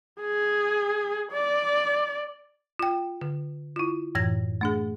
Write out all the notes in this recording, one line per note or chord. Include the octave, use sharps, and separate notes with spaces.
G#4
D5
F4 G5
D3
E4 F4
F#2 A2 E3 G#6 A#6
A3 D4 G#4